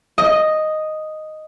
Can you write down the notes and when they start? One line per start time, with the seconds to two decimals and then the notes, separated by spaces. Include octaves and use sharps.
0.18 D#5